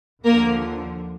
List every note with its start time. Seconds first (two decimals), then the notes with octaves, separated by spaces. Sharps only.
0.25 D#2 D3 F3 A#3 A#4